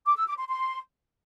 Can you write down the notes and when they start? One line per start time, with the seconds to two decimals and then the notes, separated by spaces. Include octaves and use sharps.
0.06 D6
0.17 E6
0.27 D6
0.38 C6
0.48 C6